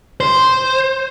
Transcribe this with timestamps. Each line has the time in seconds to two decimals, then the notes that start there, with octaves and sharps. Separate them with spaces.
0.20 C5